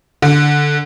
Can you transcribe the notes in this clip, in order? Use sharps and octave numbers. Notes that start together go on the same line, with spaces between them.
D3